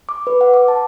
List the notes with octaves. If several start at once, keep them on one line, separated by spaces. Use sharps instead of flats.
D6
B4
F#5
D6
A5